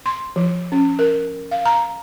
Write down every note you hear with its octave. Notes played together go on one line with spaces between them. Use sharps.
C6
F3
C#4
A#4
F5
A#5